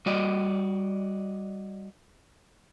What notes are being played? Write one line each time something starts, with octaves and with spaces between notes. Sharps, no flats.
G3 F#4 D5 D#5